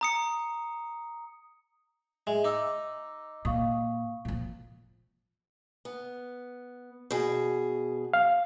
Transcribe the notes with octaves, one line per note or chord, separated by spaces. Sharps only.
A#5 D#6 C#7
G#3 E5
D#4 D6 E6
A#2 F5 C#6 D#6
A#2 F3
B3
B2 G#4
F5